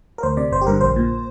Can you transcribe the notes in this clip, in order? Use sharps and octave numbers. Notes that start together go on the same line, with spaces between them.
A#4
D2 C5
C3 D5
G1 C5
G4
G2 D3 A#4
A#1 C5
A#2